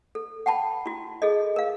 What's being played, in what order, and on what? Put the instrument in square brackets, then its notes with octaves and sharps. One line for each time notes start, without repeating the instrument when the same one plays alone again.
[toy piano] A4
F#5 G5 A5 B5
E4 F#4
G#4 A4 D#5
A#4 F5